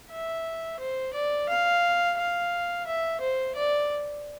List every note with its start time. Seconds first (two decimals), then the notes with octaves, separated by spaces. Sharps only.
0.11 E5
0.80 C5
1.14 D5
1.50 F5
2.18 F5
2.87 E5
3.21 C5
3.56 D5